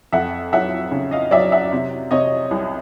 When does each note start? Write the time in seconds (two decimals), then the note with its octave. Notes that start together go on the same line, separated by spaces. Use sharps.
0.12 F2 E5 F#5
0.52 F#3 E5 F#5
0.91 C#3
1.11 D#5 F5
1.31 F#3 D5 E5
1.52 E5 F#5
1.72 C3
2.11 C3 C#5 D#5
2.51 C2